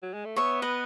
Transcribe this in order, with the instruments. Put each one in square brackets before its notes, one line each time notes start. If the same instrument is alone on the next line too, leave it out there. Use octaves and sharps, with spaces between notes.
[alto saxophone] F#3
G#3
A3
[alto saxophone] B3 [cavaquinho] C#5 E5
[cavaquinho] B4 D#5